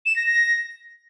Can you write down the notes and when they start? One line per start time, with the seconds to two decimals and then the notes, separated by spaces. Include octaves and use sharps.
0.06 E7
0.16 A#6
0.26 A#6